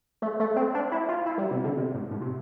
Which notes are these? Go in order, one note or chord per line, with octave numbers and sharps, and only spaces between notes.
A3
A3
C4
D4
E4
F4
E4
G3
C3
D3
C3
A2
A2
C3